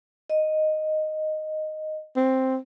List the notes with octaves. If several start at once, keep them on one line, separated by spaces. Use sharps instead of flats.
D#5
C4